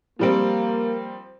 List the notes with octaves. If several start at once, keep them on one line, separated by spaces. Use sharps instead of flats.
F3 G3 A#3 C4